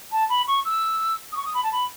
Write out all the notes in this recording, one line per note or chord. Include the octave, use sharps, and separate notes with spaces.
A5
B5
C#6
E6
D#6
C#6
D#6
B5
A5
B5